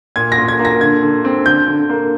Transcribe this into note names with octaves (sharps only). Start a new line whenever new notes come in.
A#2 G#6
A#6
A#2
G#6
A#3
A#6
D3 G#6
D3
C4
D3 G6
D3
A#3